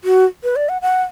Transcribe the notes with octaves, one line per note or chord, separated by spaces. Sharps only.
F#4
B4
D5
F#5
F#5